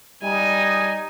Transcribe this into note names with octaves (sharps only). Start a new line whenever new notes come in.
G3 D#4 G#5